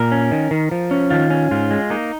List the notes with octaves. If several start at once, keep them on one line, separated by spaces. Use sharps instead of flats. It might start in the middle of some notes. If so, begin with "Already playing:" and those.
Already playing: A#2 A#4
C#4
D#3
D#3
F3
C#4
D#3 F4
C#4
G#2 F4
G#3
A#3 D#4